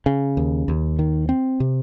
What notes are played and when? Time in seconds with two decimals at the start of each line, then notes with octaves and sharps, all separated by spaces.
0.06 C#3
0.37 D#2
0.68 D#2
0.99 D#3
1.29 C4
1.60 C3